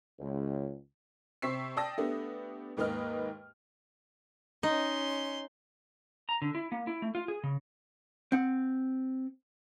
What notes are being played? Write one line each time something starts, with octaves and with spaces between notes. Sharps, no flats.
C#2
C3 C5 C#6 E6 B6 C7
D5 G5 A5 D#6 E6 A#6
A3 B3 D4 G4
D#2 G#2 A#3 B4 D#5 F6
C#4 D#4 C6
A#5
D3
E4
A#3
E4
A3
F4
G#4
C#3
C4 F#5